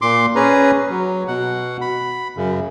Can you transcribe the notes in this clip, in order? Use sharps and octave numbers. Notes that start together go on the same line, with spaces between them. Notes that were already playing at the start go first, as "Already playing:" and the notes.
A#2 C6 D6
C#4 G#4 B4 A#5
F#3
B2 F#5
B5
F#2 C#3